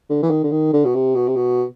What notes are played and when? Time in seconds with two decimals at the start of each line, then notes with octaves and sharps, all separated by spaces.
0.09 D3
0.22 E3
0.30 D#3
0.43 D3
0.51 D#3
0.73 D3
0.85 B2
0.94 C3
1.15 B2
1.28 C3
1.36 B2